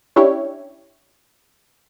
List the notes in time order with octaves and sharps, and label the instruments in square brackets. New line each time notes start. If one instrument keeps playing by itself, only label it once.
[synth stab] C#4 D4 E4 G4 C#5